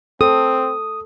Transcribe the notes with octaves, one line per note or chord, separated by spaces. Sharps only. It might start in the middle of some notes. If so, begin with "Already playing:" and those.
C4 A4 D#6